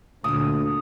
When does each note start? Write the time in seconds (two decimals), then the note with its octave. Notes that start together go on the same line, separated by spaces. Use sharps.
0.24 D2 A#2 D3 A3 D#6